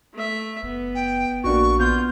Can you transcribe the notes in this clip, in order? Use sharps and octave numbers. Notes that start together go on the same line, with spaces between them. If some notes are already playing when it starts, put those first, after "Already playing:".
A3 E5
F#1 B3
G5
A#1 A#3 D4 F#4 C#6
B3 F4 G6